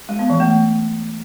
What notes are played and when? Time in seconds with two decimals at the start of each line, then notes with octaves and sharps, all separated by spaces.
0.09 G#3
0.19 B3
0.30 E3
0.40 A3